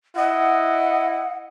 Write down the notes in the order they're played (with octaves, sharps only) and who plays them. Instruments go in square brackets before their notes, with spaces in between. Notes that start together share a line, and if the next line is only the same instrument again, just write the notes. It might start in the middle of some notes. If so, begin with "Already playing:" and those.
[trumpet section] E4 D#5 [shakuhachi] F#5